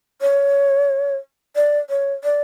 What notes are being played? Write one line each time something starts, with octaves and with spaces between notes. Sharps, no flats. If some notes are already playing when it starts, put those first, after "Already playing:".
C#5
D5
C#5
D5